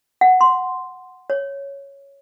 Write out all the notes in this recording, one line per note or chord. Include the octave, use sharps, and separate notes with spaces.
F#5
C6
C#5